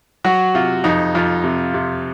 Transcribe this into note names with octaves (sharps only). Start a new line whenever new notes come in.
F#3 F#4
C3 F4
F2 D#4
F2 F4
C3
C3